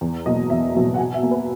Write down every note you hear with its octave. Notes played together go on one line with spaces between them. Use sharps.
E2
B2 F#3 A#3 D#5
E2 E5
B2 F#3 A#3 E5
F#5
B2 G#5
E5
A#3
B4